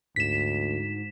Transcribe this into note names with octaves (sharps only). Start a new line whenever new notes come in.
D2 G#2 B6 E7